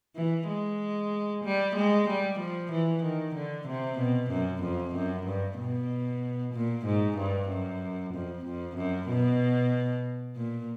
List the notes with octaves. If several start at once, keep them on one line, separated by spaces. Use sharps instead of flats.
E3
G#3
G3
G#3
G3
F3
E3
D#3
D3
C3
B2
F#2
F2
F#2
G2
B2
A#2
G#2
G2
F#2
F2
F2
F#2
B2
A#2